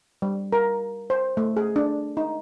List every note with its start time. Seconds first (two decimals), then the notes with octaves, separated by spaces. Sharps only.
0.22 G3
0.53 A#4
1.10 C5
1.37 A3
1.57 G#4
1.76 D4
2.17 D#4